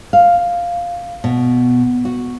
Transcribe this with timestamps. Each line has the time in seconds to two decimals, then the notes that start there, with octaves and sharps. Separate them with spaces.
0.13 F5
1.24 B2
2.05 F#4